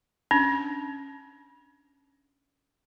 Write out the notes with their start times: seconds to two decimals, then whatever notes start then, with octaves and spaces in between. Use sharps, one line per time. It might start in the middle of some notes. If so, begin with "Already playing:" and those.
0.31 C#4 D4